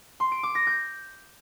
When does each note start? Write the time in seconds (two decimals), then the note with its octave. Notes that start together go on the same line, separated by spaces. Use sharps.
0.20 C6
0.32 D7
0.43 D6
0.55 A#6
0.67 G6